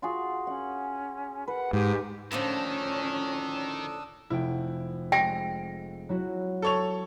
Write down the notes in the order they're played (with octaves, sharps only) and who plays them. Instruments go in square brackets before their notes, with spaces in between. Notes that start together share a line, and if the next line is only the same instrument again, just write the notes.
[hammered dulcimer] F4 F#4 G#4
[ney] C#4 [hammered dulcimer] F#5
[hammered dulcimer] B4 [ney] F#5
[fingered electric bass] G#2 [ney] G4
[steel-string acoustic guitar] A2 D3 F3 [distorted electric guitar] D#3 [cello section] C#4 [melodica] D4 D#6 E6
[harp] F1 G5 [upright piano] E4
[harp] G#3 [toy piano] G5 [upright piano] A#6 D7
[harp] F#3 E4 F#4
[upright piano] A4 C#5 F7